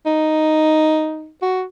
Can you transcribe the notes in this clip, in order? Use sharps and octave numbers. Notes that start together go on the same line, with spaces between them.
D#4
F#4